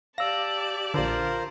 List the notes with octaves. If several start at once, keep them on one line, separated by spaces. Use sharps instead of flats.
G4 D5 F5 A5 E6 A#6
A#1 D3 F4 A#4 C5